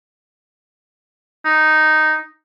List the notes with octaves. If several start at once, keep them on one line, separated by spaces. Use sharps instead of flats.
D#4